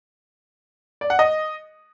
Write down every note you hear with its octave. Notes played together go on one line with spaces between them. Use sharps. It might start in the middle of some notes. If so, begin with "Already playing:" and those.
D5
F#5
D#5